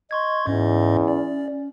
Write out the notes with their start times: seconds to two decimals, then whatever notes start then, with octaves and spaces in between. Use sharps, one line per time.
0.11 D#5 C6 C#6 G#6
0.47 E2 G#2 C#4 D#5
1.08 D5